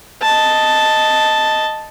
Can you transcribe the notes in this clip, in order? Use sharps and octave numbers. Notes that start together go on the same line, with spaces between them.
D#5 A5